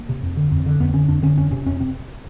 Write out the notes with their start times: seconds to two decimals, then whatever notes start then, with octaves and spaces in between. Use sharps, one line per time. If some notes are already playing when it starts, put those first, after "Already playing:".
Already playing: A#3
0.09 C3
0.22 F2
0.37 D3
0.51 F2
0.66 D3
0.80 F2 B3
0.94 D3 C#4
1.09 F2 D4
1.23 D3 C#4
1.37 F2 C#4
1.51 C3 C#4
1.65 F2 C#4
1.80 C3 C4